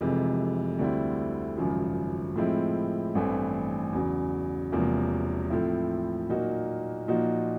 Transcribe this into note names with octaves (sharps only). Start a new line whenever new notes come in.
F1 F2 C3 E3 G#3
D2 D3 G3 C4 E4
G#1 F#2 C#3 F3
A2 F3 G#3 C4 E4
A1 G2 E3 A3 C4
E2 C#3 F#3
E1 E2 C3 F3 A#3
A2 F3 A3 C4 E4
A#2 F#3 A#3 D#4 F#4
A#2 F3 A#3 D#4 F#4